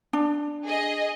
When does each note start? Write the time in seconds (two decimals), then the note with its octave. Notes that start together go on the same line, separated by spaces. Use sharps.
0.13 D4
0.65 G#4 D#5